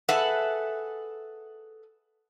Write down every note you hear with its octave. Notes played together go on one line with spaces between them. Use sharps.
G#4 A4 B4 E5 F#5